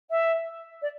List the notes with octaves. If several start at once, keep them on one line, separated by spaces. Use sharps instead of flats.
E5
D5